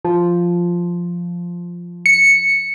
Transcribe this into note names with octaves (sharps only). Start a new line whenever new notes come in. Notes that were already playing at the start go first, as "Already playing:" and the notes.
F3
C#7